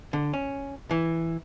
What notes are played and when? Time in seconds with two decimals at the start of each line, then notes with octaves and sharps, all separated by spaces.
0.13 D3
0.33 C#4
0.91 E3